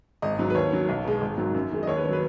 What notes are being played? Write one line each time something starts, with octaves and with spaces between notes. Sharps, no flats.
G#1 D#5
G#2 F#3
B4
D#2 C#5
D#3 F#3
B1
B2 G#3
G#1
G#2 D#3 F#3
F#2
D#3 G#3
D#5
D#2 C#5
B4
D#3 C#5
F#3 B4